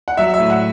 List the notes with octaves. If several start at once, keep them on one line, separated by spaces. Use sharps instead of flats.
F#5
F#3 E5
E5
A2
F#5